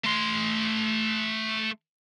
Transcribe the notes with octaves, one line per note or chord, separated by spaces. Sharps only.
A3 C6